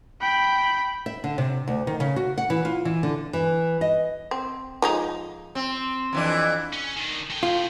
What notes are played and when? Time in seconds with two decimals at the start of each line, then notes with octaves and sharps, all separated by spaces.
0.21 G5 B5
1.06 E5
1.24 D3
1.38 C3
1.68 D2
1.87 D#3
2.00 C#3
2.16 F#4
2.38 F#5
2.50 E3
2.65 F4
2.85 E3
3.03 D3
3.33 E3
3.81 D#5
4.31 C4
4.82 F3 G#3 D#4
5.55 C4
6.13 F2 E3 D4
6.73 C#4
6.97 D#3 D4
7.30 A3 G5
7.43 F4